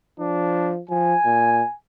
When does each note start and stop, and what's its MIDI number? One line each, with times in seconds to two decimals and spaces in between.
0.19 0.81 53
0.19 0.73 62
0.89 1.14 53
0.89 1.74 80
1.25 1.62 46